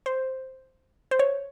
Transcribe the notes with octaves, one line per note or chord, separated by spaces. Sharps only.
C5
C5
C#5